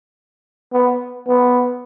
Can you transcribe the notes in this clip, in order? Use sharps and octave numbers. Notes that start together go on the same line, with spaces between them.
B3
B3